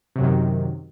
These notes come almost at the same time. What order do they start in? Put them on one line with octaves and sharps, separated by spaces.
C3 F#3 F#2 D#3